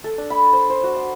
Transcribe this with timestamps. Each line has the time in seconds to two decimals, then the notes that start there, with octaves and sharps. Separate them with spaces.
0.04 A4
0.18 D4
0.30 B5
0.53 C5
0.70 C5
0.83 F#4
0.96 D6